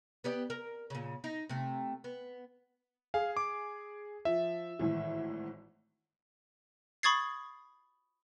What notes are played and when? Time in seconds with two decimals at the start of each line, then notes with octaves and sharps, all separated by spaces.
0.24 B3 G4 D5
0.50 A#4
0.90 A#2 C#3
1.24 D#4
1.49 C3 A3
2.04 B3
3.14 G#4 F5
3.37 D6
4.25 F3 E5
4.79 G#1 A2 E3
7.03 B5 C#6 D#6 G#6 A6 C7